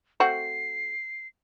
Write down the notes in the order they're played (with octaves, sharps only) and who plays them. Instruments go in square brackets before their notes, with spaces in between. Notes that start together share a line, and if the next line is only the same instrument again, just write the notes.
[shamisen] A3 C4 F#4 [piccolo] C7